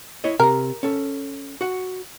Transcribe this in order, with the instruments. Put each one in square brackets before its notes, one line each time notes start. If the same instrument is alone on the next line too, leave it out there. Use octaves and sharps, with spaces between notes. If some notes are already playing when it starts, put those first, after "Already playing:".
[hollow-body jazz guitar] E4 C#5 D#5
[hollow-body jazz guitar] C3 A#5 [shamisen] A#4
[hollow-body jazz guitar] C#4 A4
F#4 F#5